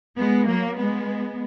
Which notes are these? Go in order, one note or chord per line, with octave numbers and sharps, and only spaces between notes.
G#3 B3
F#3 A#3
G#3 B3